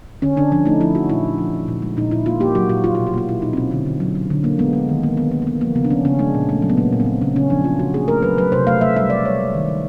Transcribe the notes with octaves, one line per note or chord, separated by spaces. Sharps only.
D3 C#4
D3 D4
F3 D4
A3 D#4
F3 E4
F3 F#4
A#2 E4
A#2
F3
A#2
A#2
G#3
A#2 D#4
A#2 E4
A#3 F4
A#3 G4
F#3 F#4
A#2 F#4
A#3 F4
B2 F4
F#4
A#3 F4
B2 E4
B2 D#4
C4
B2 C#4
D3 C4
D3
F#3
F#3
D3
A#3
G#3 B3
G#3
D#3
D#3 A#3
D#3 B3
D#3 A#3
A#3
G#3 B3
F3 A#3
C#3 B3
D4
F3 C#4
C#3 C#4
G#3 D4
A#2
A3
F#3
B3
A#2 A#3
A#2
C4
A#2
C#3 C#4
C#3 C#4
F3 D4
A#3 F4
C#3 F#4
A#3 G#4
A3 A#4
F#3 B4
F#3 B4
C3 C5
A3 F5
A3 E5
G3 E5
G3 D5
G3 C#5
A#3
D#3
G3